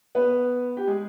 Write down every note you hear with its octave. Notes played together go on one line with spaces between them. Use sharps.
B3 B4
G4
G#3 G#4